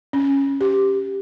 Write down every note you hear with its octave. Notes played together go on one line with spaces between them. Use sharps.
C#4
G4